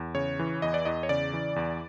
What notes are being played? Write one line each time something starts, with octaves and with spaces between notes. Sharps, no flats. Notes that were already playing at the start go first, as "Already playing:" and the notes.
Already playing: E2
C#3 C#5
E3
E2 D#5
D5
E2 D#5
C#5
C#3 D5
E3
E2